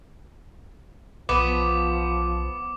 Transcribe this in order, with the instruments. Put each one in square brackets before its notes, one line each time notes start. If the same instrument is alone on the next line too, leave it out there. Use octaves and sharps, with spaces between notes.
[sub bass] B1 [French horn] F3 [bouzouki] B3 [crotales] D6